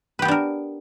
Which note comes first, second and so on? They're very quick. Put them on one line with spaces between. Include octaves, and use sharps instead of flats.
B4 G4 B3 D4 A#4